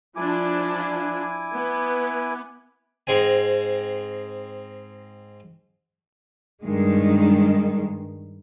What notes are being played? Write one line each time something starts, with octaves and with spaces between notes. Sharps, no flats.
F3 D4 E4 G#5 D6
B3
G#2 G#3 C4 G#5
G2 D#3 G#3